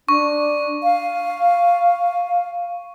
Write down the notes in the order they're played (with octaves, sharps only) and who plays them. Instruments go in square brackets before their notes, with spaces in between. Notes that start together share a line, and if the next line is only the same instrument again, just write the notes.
[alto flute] D4 [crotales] C#6
[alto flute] F5